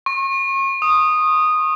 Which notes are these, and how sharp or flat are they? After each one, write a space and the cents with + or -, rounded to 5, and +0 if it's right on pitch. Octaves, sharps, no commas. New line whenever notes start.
C#6 -40
D#6 -5